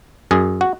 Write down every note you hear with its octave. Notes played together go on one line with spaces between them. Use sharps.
F#2 G#4
F#4